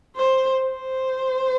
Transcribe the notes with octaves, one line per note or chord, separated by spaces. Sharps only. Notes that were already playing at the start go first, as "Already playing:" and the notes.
C5
C5